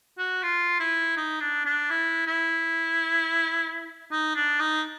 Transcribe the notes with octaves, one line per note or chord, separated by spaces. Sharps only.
F#4
F4
E4
D#4
D4
D4
E4
E4
D#4
D4
D#4